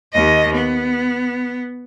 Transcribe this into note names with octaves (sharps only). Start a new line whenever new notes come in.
D#2 D#5
B3